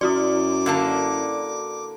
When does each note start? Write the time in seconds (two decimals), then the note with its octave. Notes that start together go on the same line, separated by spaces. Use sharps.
0.01 F#2 E4 F#4 D5 D6
0.66 D3 A#3 A5